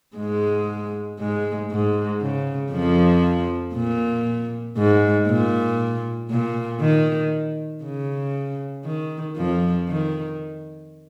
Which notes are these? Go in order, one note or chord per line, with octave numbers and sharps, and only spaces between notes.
G#2 G#3
G#2 G#3
G#2
C#3
F2 F3
A#2
G#2
A#2
A#2
D#3
C#3
D#3
F2 F3
D#3